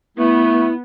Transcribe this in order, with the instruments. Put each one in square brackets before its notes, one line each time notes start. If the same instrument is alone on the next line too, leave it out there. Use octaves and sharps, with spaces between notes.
[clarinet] A3 [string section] B3 [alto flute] E4